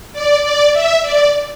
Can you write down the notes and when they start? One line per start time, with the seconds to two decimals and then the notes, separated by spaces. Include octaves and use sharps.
0.13 D5
0.43 D5
0.72 E5
1.02 D5